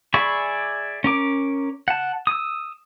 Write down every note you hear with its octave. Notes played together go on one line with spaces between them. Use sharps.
G#4 D5 E5 B5 C#6
C#4 A#4 D6
F#5 A5
D#6 E6